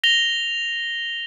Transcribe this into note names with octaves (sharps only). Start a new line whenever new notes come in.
A#6 F7 G7